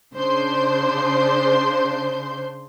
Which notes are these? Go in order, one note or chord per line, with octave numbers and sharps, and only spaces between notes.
C#3 D4 C5 C6 G6